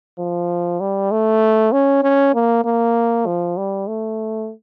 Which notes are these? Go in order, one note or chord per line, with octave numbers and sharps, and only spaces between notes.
F3
G3
A3
C#4
C#4
A#3
A#3
F3
G3
A3